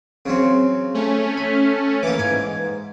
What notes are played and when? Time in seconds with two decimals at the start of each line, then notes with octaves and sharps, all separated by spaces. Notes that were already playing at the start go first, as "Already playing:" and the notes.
0.26 C#3 F#3 C4
0.94 A3 C#4
1.37 B5
2.03 E3 A#3 D6
2.19 G#2 G#5